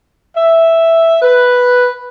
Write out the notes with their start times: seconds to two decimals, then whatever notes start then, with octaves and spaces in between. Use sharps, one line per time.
0.37 E5
1.22 B4